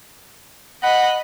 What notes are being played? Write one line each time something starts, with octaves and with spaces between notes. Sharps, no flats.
D#5 F#5 B5